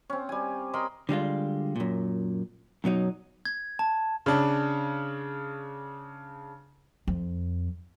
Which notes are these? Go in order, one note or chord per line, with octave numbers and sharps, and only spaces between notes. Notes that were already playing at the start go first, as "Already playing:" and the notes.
C4 C#4
G3 G#5
A#4 D#5 B5 C6
D3 G3 G#3 F4
F#2 A#2
F#2 B2 F#3 D#4
G#6
A5
C#3 D4
F2